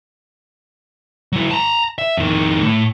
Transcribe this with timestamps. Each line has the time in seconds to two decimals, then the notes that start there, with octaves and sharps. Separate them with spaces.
1.32 F#3 E4
1.51 A5 A#5
1.98 E5
2.17 F2 D#3
2.62 A2